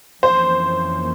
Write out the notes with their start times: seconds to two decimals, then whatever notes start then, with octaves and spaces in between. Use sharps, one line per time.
0.22 F2 E3 A#3 C#4 C5